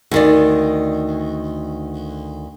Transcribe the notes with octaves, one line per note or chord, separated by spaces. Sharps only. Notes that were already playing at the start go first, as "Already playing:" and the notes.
D2 D#3 D5